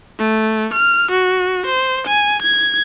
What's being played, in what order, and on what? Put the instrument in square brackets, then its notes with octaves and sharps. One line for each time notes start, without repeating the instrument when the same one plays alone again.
[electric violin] A3
F6
F#4
C5
G#5
G#6